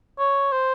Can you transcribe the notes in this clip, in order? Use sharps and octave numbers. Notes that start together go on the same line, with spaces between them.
C#5
C5